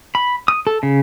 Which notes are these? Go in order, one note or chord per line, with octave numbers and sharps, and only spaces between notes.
B5
D#6
A4
C#3